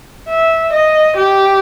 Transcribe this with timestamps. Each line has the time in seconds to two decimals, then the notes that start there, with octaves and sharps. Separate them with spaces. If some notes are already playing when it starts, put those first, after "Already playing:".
0.29 E5
0.73 D#5
1.17 G4